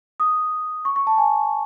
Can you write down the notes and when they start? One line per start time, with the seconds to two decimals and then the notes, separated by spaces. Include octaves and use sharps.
0.20 D#6
0.85 C#6
0.96 C#6
1.07 A5
1.18 G#5